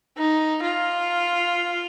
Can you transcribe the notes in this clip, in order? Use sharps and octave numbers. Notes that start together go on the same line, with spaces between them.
D#4
F4